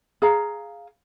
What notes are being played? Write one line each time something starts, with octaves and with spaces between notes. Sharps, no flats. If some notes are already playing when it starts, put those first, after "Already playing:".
G#4 F5 A#5